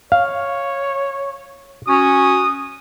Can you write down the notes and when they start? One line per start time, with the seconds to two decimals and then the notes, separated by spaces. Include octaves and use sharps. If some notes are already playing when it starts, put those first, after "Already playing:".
0.12 C#5 F5
1.87 C#4 F#4 D#6